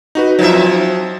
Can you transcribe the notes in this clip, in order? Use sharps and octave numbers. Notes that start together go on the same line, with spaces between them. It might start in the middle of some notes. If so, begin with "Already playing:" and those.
D#4 F#4 B4
F3 F#3 D#4 E5
C4